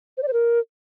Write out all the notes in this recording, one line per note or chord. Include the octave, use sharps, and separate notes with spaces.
C5
D5
C5
A#4